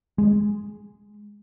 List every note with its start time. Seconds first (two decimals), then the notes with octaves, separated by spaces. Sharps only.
0.18 G#3